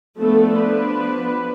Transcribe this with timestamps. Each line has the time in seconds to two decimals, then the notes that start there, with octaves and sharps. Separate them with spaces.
0.19 F3 A3 B3 D4 A4
0.59 B3 B4